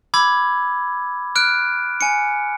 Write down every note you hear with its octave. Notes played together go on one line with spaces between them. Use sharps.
B5 D6 E6 G#6
F6 F#6 D7
G#5 C#7